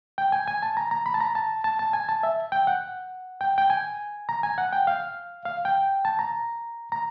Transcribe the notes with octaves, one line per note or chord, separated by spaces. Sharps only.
G5
G#5
G#5
A5
A#5
A#5
B5
A5
A#5
A5
A5
A5
G#5
A5
E5
G5
F#5
G5
G5
G#5
A#5
G#5
F#5
G5
F5
F5
G5
A5
A#5
A#5